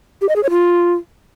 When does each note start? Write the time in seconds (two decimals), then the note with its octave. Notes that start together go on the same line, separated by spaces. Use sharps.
0.22 G4
0.29 D#5
0.36 G#4
0.43 C#5
0.50 F4